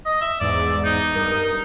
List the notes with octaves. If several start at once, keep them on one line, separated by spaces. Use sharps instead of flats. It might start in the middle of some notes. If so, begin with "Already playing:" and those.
D#5
E5
E2 G#2 D5
D#4
G2 A#4 D#6